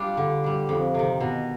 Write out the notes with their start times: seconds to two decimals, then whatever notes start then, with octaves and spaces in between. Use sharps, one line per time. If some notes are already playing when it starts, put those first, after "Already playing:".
Already playing: G3 D4 F4
0.17 D3
0.44 G3 D4
0.69 F2
0.94 C3 D#3
1.20 B2